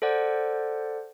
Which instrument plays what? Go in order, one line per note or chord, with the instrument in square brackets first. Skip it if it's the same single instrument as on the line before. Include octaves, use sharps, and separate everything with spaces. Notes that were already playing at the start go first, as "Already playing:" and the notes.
[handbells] A4 C5 D5 F#5